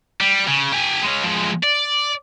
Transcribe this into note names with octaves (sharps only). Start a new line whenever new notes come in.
G3
C#3
G4 G#5
G#3 C#4
F3 G#3
D5